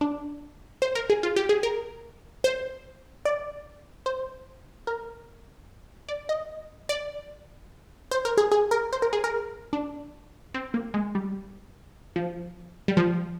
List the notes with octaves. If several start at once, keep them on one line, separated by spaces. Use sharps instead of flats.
D4
C5
A#4
G#4
F4
G4
G#4
A#4
C5
D5
C5
A#4
D5
D#5
D5
C5
A#4
G#4
G#4
A#4
C5
A#4
G#4
A#4
D4
C4
A#3
G#3
G3
F3
G3
F3